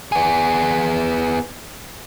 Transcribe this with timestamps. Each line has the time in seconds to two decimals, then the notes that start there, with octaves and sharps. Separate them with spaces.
0.12 B3 G#4